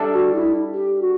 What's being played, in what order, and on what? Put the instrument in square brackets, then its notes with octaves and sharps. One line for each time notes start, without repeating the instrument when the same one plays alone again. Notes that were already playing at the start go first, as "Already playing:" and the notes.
Already playing: [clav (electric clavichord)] G3 D4 A4 E5
[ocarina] F#4
E4
G4
F#4